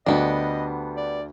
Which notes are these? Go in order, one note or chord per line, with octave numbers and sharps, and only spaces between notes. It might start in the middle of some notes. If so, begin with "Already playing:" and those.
D2 D3 G3 B3 D4 D#5
D5